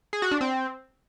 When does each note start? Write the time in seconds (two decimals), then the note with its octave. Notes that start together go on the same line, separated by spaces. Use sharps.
0.13 G#4
0.22 F#4
0.31 D4
0.41 C4